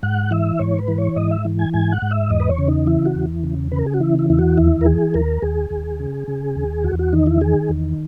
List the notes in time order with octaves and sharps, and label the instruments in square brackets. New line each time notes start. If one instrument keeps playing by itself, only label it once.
[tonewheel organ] G#2 F#5
E3 E5
G#2 C#5
B4
E3
C#5
G#2 D#5
E5
E3
G#5
G#2 G#5
F#5
G#2
E5
E2 D#5
B4
C#5
C#3
D#4
E3 E4
F#4
E2
C#3
C#3 B4
A#4
G#4
F#4
E3 E4
E4
E2 E4
F#4
D#2 E4
A#4
E3 G#4
D#2 A#4
D#2 G#4
D#2
C#3
C#3
D#2
E2 F#4
F#4
D#3 D#4
E4
D#3 G#4
E2